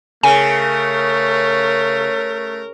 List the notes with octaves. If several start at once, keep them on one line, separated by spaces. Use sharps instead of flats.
C#3 A3 A#4 G#5